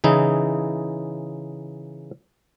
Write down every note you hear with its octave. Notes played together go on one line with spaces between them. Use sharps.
C#3 E3 D#4 E4 G#4